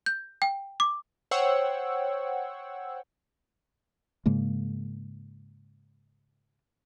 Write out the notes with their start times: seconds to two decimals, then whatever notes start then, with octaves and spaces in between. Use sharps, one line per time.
0.06 G6
0.42 G5
0.80 D6
1.31 C5 C#5 F#5 G5 C#6 E6
4.26 G#2 C#3 G#3 A#3